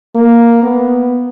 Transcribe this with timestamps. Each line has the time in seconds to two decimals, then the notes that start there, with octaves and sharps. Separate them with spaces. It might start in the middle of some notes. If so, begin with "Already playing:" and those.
0.15 A#3
0.63 B3